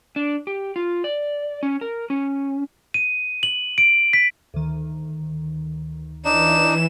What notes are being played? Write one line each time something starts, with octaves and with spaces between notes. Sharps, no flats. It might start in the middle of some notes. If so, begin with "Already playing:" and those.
D4
G4
F4
D5
C#4
A#4
C#4
D#7
F#7
D7
B6
D2 D#3
E3 D4 D#4 E7